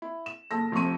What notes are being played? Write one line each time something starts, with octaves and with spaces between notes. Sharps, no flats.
E4
E7
F#1 A4 A#6
F1 F2 C3 C#6 D#7